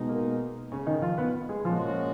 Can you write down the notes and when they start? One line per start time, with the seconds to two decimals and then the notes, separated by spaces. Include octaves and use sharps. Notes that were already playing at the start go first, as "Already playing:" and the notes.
Already playing: B2 G#3 D#4
0.09 A#3
0.72 C#3 C#4
0.87 D#3 D#4
1.02 F3 F4
1.18 B3 B4
1.49 G#3 G#4
1.65 A#2 F3 G#3 C#4 F4 F#4